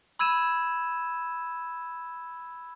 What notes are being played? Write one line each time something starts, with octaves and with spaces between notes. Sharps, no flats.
B5 E6 G#6 D#7 E7